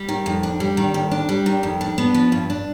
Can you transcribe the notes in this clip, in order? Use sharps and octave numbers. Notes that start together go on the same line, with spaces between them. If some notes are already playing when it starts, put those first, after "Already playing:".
Already playing: G3
D#3
F2
D4
G3
D#3
F2
D4
G3
D#3
F2
D4
B3
F3
G2
D4